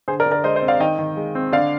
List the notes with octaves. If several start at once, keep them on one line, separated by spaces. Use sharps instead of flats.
D3 G#4 C5
A#4 D5
D3
A#4 D5
G#3 C5 D#5
C5 D#5
C4
D5 F5
D#3 D#5 G5
D#3
G#3
C4
D3 D5 F5